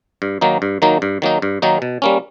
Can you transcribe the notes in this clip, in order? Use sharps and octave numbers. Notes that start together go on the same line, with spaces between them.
G2
D#3 F#3 A#3 D#4
G2
D#3 F#3 A#3 D#4
G2
D#3 F#3 A#3 D#4
G2
D#3 F#3 A#3 D#4
B2
G3 A#3 C#4